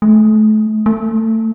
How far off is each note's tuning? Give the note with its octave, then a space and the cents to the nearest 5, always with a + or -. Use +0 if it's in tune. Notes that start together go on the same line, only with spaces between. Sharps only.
A3 -35
A3 +25